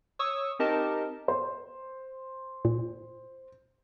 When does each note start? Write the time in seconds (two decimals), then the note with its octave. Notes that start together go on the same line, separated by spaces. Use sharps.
0.19 C#5 C#6 D#6 E6
0.59 C4 D#4 G4 A#4 D#5 A5
1.28 C5
2.65 A#2